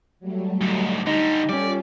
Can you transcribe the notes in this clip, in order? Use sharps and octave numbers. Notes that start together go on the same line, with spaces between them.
F#3 G3 A3
D2 G#2
D3 G3 D#4 G#5
G3 C#4 F4 A4 D5